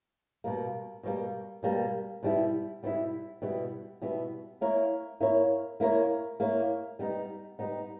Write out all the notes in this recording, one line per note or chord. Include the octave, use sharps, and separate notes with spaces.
B2 G3 A#3
B2 G3 A#3
B2 G3 A#3
B2 G3 B3 E4
B2 G3 B3 E4
B2 G3 B3 E4
B2 G3 B3 E4
A#3 E4 A#4 C#5
A#3 E4 A#4 C#5
A#3 E4 A#4 C#5
A#3 E4 A#4 C#5
G3 B3 D#4
G3 B3 D#4